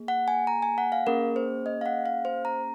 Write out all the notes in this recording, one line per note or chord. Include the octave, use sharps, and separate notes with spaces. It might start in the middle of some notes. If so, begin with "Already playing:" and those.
Already playing: A#3 G#4
F#5
G#5
A#5
G#5
F#5
F5
A#3 C#4 G#4 A#4
C5
D#5
F5
F#5
F5
C5
A#5